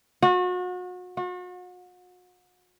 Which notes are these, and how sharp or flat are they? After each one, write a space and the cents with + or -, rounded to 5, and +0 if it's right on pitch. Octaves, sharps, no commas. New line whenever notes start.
F#4 -35
F#4 -40